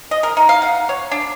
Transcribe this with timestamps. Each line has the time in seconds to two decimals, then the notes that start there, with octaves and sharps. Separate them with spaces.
0.11 D#5
0.23 A#4
0.37 D#4
0.49 F5
0.62 F#5
0.89 C#5
1.12 D4